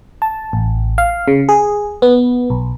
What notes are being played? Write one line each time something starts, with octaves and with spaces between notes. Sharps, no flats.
A5
A1
F5
C#3
G#4
B3
B1